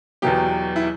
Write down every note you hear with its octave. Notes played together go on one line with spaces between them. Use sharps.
E2 B2 F#3 G4
E4